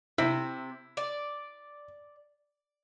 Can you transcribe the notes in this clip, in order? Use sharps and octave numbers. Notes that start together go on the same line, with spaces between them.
C3 E4
D5